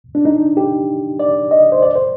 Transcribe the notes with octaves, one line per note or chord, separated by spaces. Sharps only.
D4
D#4
G4
D5
D#5
C5
D5
C5